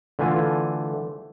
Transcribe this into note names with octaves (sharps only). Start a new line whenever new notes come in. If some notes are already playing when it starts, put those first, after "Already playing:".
D3 E3 A3 F4 G#5